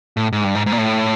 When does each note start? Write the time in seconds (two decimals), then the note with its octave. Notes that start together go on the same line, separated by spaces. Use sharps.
0.17 A2
0.33 G#2
0.44 G2
0.55 G#2
0.66 G#2
0.72 A#2
0.78 A2